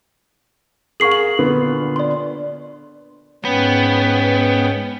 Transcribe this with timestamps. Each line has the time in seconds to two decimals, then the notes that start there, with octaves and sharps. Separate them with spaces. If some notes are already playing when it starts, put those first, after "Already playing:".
1.00 G#4 A#4 F5 C#6 C7 F#7
1.12 F#7
1.39 A#2 D3 B3
1.96 D5 C6
3.45 G#2 B3 C#4 G5